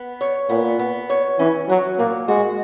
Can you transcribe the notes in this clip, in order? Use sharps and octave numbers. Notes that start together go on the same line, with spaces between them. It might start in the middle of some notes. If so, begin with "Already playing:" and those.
Already playing: B3
C#5
A#2 B3
B3
C#5
E3 C#4
F#3 F#4
A#2 A#3
G#3 F#4